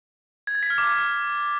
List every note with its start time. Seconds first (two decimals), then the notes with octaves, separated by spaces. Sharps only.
0.47 G#6
0.55 A6
0.63 B6
0.70 F6
0.78 D6